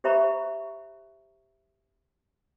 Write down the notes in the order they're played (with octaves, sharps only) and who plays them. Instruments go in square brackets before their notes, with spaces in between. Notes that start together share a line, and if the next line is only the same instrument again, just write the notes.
[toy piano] G4 C5 E5 A#5 B5 C#6